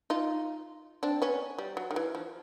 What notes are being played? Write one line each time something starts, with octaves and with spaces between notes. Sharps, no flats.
D#4 F4
C4 D4
B3 C#4
G3
F#3
D#3
E3
F3